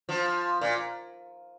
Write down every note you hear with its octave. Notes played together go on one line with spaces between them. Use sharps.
F3
A#2